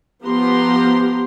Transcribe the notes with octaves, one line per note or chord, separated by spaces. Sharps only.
F3 B3 G4 A#5 C6